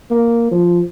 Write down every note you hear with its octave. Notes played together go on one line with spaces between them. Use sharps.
A#3
F3